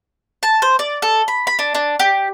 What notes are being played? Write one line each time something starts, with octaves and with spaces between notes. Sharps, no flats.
A5
C5
D5
A4
B5
B5
D4
D4
G4